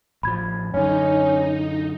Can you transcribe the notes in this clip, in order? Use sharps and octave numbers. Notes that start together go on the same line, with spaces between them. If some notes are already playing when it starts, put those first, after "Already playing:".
A1 F3 B5 G#6
F#2 D3 C#4 D#4